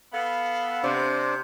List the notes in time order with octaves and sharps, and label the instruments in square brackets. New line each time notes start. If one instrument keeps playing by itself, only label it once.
[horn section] B3 A4 [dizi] F5
[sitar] C3 [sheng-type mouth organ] D4 C5 D5